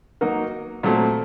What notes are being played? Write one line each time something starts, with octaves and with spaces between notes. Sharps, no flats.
F#3 A#3 D#4 F#4 A#4
A#2 F#3 A3 C4